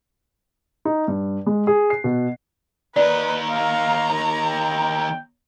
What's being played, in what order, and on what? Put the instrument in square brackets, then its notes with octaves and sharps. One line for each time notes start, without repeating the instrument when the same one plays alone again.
[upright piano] D#4
G2
G#3
G#4
C7
B2
[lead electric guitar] D#2 D#4 [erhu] B4 [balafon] D5
[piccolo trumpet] F5 [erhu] A#5
[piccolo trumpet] G5